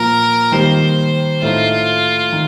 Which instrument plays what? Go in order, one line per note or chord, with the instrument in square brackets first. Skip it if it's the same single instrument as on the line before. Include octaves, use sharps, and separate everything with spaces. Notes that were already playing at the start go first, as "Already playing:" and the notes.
Already playing: [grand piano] A#2 F3 A#3 [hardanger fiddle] A#4
[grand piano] D#3 G3 A#3 [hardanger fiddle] C5
[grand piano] A2 A3 D#4 [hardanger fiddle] F4
[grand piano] D#3